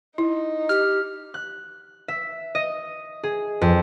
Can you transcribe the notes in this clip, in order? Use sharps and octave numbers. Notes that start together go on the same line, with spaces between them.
D#4 E4
G4 F6
F#6
E5
D#5
G#4
F2